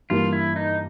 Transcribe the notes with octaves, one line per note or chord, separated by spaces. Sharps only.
G2 E3 G3 A#3 F4
E4
D#4